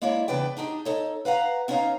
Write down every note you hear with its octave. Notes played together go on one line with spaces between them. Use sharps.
G#3 A#3 E4 C#5 D5
E2 C#3 D4 B4 D5 G5
D4 D#4 G4 G#4
D#4 A4 C#5
B4 F5 F#5 A#5
B3 C#4 D#4 C#5 F5 A#5